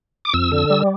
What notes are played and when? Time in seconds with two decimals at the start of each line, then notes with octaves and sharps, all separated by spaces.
0.25 D6
0.34 F2 E6
0.52 D3
0.70 G3